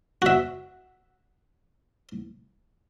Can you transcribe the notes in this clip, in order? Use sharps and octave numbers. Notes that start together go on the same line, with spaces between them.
F#4 E5